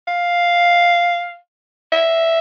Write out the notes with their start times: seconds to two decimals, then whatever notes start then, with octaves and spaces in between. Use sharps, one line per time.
0.08 F5
1.92 E5